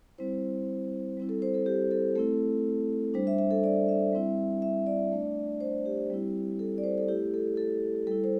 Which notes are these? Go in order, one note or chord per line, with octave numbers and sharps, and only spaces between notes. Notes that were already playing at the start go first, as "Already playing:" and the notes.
G3 C4 E4 C5
G3 C4 E4
A4
C5
A4
G4
A4
A3 C4 E4 A4
G3 D4 C5
E5
E5
A4
D5
E5
G3 C4 E4
E5
D5
A3 D4
C5
G4
G3 C4 E4
A4
D5
C5
A4
A3 E4 G4
A4
A4
G3 E4 A4
C5